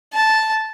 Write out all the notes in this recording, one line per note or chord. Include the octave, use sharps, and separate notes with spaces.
A5